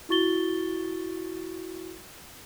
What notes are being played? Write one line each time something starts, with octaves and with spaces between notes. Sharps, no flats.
E4 F#4 C#6 A6 G7